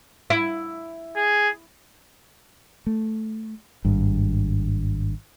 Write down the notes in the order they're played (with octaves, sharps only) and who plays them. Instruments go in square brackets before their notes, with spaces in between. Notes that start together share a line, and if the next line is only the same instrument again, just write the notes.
[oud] E4
[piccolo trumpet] G#4
[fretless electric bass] A3
G#1 G2